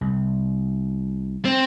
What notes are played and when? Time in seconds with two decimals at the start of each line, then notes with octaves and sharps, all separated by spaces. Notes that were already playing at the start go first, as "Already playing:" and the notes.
0.01 C2
1.45 C4